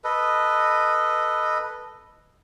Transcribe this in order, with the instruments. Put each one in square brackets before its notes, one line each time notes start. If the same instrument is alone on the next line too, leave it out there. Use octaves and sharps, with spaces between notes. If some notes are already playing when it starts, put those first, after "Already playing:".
[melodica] A4 B4 D#5